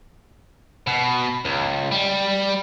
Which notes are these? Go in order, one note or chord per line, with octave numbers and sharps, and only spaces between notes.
B2
C#2
G3